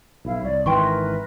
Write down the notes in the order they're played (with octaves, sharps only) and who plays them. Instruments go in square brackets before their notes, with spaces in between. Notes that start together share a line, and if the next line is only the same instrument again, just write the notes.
[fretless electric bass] B1 [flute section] E4 F5
[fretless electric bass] C2 [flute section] C#5 D5
[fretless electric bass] G#1 D#3 E3 [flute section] A#4 B4 [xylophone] G5 C6 C#6